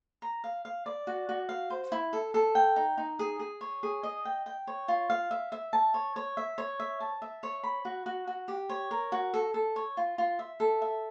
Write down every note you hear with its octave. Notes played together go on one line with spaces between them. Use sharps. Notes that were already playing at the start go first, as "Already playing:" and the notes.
A#5
F5
F5
D5
F#4
F#4
F5
C5
E4
A4
A4
G5
D#4
D#4
G#4
G#4
C#5
G#4
D#5
G5
G5
C#5
F4
F5
E5
E5
A5
C#5
C#5
E5
C#5
E5
A5
E5
C#5
B5
F#4
F#4
F#4
G4
C#5
A#4
F#4
A4
A4
C#5
F4
F4
E5
A4
E5